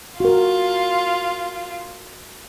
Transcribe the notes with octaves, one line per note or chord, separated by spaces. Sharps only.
F4 F#4 A#4